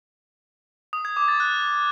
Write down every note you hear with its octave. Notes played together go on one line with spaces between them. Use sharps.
D#6
G#6
D6
A6
F#6